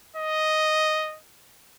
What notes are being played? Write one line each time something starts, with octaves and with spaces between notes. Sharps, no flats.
D#5